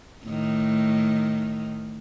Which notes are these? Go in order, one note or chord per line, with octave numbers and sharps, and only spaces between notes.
A2 D#3